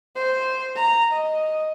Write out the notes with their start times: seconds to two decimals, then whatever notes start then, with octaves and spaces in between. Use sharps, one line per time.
0.16 C5
0.76 A#5
1.13 D#5